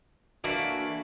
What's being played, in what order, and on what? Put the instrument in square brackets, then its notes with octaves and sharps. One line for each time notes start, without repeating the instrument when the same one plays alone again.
[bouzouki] E3 A3 A#3 [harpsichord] D4 F#4